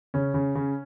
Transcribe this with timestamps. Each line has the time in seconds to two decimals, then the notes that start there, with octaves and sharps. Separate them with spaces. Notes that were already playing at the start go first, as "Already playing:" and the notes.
0.14 C#3 C#4
0.34 C#3
0.55 C#3